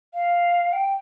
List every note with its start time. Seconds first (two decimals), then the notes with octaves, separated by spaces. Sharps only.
0.14 F5
0.73 G5